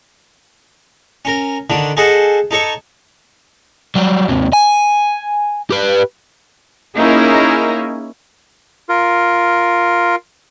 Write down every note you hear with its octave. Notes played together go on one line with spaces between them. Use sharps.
C#4 A#4
D3 D#3 D4
G#4 A4 C5 D#5 F#5
D#4 A4 C#5
F#3 G3
D#2 C3
G#5
G4 B4
A#3 C#4 D#4 E4 G#4 A#4
F4 A#4